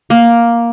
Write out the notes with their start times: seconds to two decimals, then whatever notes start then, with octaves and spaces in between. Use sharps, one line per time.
0.10 A#3